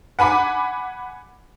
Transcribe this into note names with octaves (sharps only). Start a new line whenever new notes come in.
F#5 G#5 B5 D6